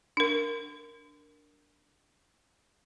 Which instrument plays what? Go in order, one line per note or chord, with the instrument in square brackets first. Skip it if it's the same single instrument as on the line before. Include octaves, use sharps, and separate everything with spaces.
[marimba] D4 A#4